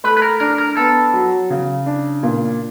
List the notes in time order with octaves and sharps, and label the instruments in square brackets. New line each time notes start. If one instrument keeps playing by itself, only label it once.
[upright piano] A3 [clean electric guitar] B4
[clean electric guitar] B4
A#4
[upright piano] D4 [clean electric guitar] A#4
[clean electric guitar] A#4
[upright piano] B3 [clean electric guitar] A4
[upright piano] F#3
C#3
D4
A#2